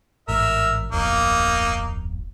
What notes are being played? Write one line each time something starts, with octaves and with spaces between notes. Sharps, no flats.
A1 G#2 A#4 E5
D1 G1 F2 A#3 D#4